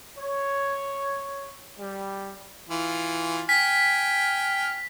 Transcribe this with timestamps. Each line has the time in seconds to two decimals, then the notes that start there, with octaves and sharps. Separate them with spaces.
0.19 C#5
1.79 G3
2.69 E3 F4
3.49 G5 G#5 F6 B6